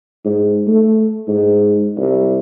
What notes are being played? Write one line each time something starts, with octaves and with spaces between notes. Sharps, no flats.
G#2
A3
G#2
C2